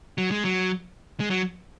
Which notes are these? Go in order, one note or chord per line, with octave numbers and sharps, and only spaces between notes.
F#3
G#3
F#3
G#3
F#3